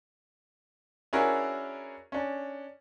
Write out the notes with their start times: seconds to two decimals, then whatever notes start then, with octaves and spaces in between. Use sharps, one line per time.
1.13 C#4 D4 E4 F#4 G#4 A#4
2.12 C#4 D4